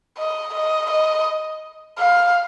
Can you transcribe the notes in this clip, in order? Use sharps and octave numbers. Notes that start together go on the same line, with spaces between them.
D#5
D#5
D#5
F5